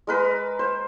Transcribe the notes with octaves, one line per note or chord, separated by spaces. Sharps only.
G#3 A#4 B4
C5